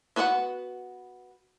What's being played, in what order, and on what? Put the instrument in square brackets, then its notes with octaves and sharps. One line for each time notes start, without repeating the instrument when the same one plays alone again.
[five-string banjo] B3 F#4 B4 C5 F#5